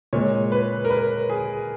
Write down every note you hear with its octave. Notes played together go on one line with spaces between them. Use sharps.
A#2 G#3 C#5
B4
A#4
B4
G#4